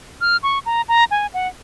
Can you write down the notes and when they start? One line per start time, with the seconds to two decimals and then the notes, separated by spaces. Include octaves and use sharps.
0.21 F6
0.43 C#6
0.66 A#5
0.89 A#5
1.11 G#5
1.34 F#5